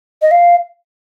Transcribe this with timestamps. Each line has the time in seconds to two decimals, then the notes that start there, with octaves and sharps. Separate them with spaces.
0.22 D#5
0.31 F5